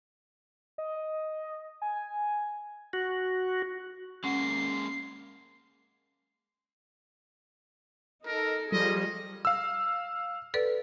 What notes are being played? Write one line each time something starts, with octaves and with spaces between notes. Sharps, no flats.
D#5
G#5
F#4
G#3 A#3 C#4 F#5 C7
D#4 A4 A#4
F3 G3 G#4 A4 D#5
F5 E6
A4 B4 D5